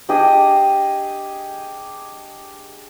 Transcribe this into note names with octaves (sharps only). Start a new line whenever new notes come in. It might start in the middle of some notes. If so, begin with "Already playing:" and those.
D4 G4 G#4 D#5